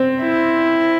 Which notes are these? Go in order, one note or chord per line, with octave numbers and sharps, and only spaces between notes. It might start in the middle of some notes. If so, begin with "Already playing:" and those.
Already playing: C4
E4